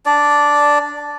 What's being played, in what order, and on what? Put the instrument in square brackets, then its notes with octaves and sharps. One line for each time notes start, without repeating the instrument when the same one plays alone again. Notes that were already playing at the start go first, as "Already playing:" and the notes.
[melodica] D4 D5